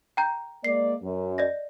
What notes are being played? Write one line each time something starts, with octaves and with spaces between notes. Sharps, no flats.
G5 A#5 G6
G#3 A#3 D5 C7
F#2
D5 D#5 A#6